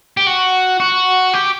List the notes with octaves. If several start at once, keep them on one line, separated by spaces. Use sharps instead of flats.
G4
F#4
F#4
G4